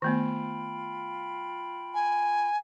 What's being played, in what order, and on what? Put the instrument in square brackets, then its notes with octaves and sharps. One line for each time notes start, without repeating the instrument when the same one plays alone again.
[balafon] D#3 A3 B3 [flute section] F4 G5 B5
[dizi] G#5